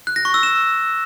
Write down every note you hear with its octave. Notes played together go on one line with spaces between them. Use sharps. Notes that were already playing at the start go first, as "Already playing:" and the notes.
F#6
A#6
C#6
E6
E7